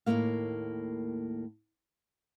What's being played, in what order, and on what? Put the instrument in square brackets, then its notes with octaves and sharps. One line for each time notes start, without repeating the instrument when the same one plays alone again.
[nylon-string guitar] D#2 A2 E3 G#3 A#3 F5